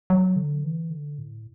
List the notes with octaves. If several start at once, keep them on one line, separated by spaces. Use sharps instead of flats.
F#3
D3
E3
D3
A2